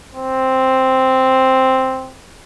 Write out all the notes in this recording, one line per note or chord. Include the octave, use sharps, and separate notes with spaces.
C4